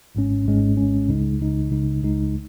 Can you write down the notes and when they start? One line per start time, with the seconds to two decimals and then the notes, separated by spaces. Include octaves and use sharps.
0.15 G#1 G#2 G#3 C#4
0.45 G#1 G#2 G#3 C#4
0.77 G#1 G#2 G#3 C#4
1.08 C#2 C#3 G#3 D#4
1.40 C#2 C#3 G#3 D#4
1.71 C#2 C#3 G#3 D#4
2.02 C#2 C#3 G#3 D#4